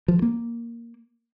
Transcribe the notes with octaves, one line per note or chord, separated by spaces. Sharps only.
F3
A#3